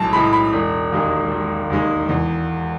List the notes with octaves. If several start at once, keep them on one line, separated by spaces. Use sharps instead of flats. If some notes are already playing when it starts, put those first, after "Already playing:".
Already playing: B1 A2 G#3 A5
A2 G#3 B5
B5
E1
D#2 D#3 G#3
E1
D#2 D#3 G#3
E2